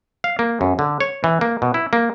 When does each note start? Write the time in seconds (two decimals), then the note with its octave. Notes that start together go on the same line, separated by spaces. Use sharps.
0.24 F5
0.39 A#3
0.61 F#2
0.79 D3
1.01 C#5
1.24 E3
1.41 A#3
1.62 B2
1.74 E4
1.93 A#3